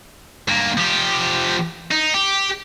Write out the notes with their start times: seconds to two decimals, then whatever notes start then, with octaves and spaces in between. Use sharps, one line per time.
0.48 G2 A#3
0.78 F3 G4
1.91 D#4
2.14 G4